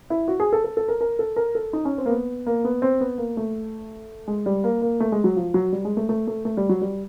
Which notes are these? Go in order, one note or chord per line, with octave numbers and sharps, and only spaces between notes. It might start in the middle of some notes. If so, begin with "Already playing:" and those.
E4
F#4
G#4
A4
A4
A4
A#4
A#4
A4
A#4
A4
D#4
C#4
C4
A#3
B3
A#3
B3
C4
B3
A#3
A3
G#3
G3
A#3
A#3
A3
G#3
F#3
F3
F#3
G3
G#3
A3
A3
A3
A3
G3
F#3
G3